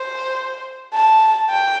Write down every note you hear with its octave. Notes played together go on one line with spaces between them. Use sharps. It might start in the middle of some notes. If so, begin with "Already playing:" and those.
Already playing: C5
A5
G5